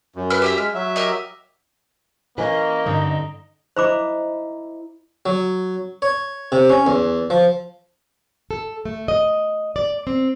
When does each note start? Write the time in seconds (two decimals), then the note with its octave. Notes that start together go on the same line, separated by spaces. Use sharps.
0.16 F#2
0.30 B4 F6
0.42 G4 E5 A#5
0.58 G#3 F6
0.74 F#3 E5
0.96 G4 A#4 D#5
2.38 E3 A#3 C#4 B4 D#5
2.86 G2 D3 D#4
3.77 E4 C5 D#5 A#5 B5 D6
5.26 F#3
6.02 C#5
6.52 C3
6.70 C#4
6.87 E2
7.30 F3
8.51 A4
8.85 A3
9.08 D#5
9.76 D5
10.07 C4